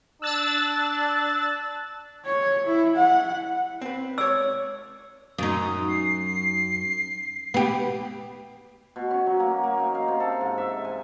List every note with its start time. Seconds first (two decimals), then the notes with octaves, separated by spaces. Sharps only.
0.22 D4 E6 F#6 A6
2.25 C#5
2.66 E4
2.97 F#5
3.81 C4 B4
4.18 C#5 D5 E6
5.38 F#2 D#4 D#6
5.89 C7
7.54 B3 G4
8.96 B2
9.11 C#4
9.26 F#3
9.40 A#3
9.63 A#3
9.79 D#4
9.95 F5
10.08 C3
10.20 A4
10.41 G#2
10.58 E5
10.85 G#5